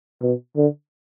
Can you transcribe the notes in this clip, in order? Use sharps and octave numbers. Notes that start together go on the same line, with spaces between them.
B2
D3